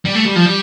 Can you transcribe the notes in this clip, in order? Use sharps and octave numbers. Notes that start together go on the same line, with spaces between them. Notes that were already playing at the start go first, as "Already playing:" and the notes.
G3
A3
G3
F3
G3